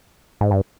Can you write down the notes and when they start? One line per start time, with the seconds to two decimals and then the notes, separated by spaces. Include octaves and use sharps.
0.41 G#2
0.51 G2